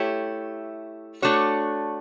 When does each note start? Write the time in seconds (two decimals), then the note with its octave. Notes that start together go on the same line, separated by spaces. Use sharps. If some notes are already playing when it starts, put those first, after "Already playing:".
Already playing: A3 E4 G4 C#5
1.22 A3 D4 F#4 C#5